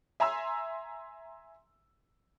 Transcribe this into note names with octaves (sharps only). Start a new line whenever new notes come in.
E5 G#5 A#5 C6 E6